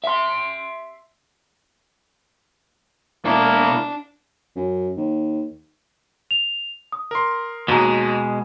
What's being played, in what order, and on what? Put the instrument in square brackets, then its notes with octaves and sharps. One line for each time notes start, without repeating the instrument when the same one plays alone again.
[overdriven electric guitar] E5 C6
[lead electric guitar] B2 E4 [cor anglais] A#3 [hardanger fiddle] D4
[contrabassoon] F#2
D#2
[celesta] F7
D#6
[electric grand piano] A#4 C6
[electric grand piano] D#2 F#4 A#5 [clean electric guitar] B2 G#3